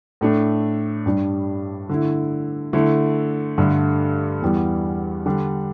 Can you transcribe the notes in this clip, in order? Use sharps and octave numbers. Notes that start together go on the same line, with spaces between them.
A2 A3 D4
G2 G3 D4
D3 A3 E4
D3 A3 E4
G2 D3 A3
E2 E3 G3 B3
D3 G3 D4